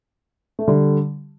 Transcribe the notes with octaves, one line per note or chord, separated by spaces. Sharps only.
A3
D3 G3